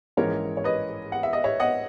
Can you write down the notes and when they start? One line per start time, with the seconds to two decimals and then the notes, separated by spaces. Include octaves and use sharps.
0.17 A#1 G#2 E3 G#3 C#4 A#4 C#5
0.57 C#5
0.64 B4 D#5
1.12 F#5
1.23 E5
1.33 D#5
1.44 C#5 E5
1.60 D#5 F#5